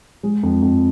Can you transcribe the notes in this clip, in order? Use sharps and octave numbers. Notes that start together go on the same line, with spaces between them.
G#3
F2
F2